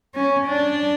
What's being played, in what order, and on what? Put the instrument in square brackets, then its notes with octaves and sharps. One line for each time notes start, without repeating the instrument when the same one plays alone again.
[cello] C#4
D4